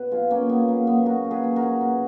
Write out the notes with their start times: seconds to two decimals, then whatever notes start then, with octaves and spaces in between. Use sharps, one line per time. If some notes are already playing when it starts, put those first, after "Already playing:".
Already playing: B2 B4
0.12 F#3 F4 G#4
0.30 A#2 A#3 C#4
0.49 A#2 B3
0.68 F#3 A#3
0.87 F#3 B3
1.06 A#2 F#4 A#4
1.24 A#2
1.31 G#4 B4
1.44 F#3
1.56 F#4 A#4
1.62 F#3
1.81 B2